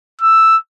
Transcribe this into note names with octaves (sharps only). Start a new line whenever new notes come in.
E6